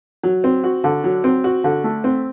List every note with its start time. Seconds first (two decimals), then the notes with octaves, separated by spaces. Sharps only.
0.23 F#3
0.44 C4
0.64 F#4
0.84 D3
1.04 F#3
1.24 C4
1.44 F#4
1.64 D3
1.84 A3
2.04 C4